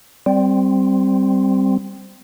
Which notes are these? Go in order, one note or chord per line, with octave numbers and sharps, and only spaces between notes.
G3 C4